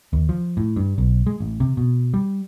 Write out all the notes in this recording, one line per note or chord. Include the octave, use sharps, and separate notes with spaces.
D#2
F3
A2
G2
B1
G#3
A1
C3
B2
G3